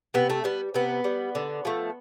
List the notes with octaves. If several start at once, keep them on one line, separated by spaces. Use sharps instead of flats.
C3 B3
A3
G3 B3
C3 B3
G3
D3
F3 A3